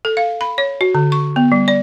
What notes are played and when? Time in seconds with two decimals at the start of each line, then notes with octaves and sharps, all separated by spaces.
0.05 A4
0.17 F5
0.41 B5
0.58 C#5
0.81 F#4
0.95 D3
1.12 C#6
1.36 B3
1.52 G3
1.68 D5